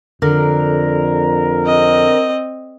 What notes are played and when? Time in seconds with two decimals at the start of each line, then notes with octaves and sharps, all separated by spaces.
0.22 F2 D3 A#4
1.65 C4 D#5